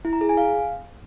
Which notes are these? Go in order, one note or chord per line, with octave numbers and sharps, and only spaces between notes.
E4
A#5
G#4
G#5
F5